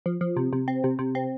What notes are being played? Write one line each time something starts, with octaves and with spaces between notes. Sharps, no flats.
F3
F3
C3
C3
C4
C3
C3
C4